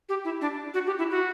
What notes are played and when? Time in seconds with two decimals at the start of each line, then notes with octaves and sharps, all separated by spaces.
0.09 G4
0.25 E4
0.41 D4
0.74 F#4
0.87 G4
0.98 E4
1.11 F#4